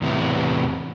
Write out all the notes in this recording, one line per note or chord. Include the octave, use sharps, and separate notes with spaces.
E2 A2 C3 E3 B3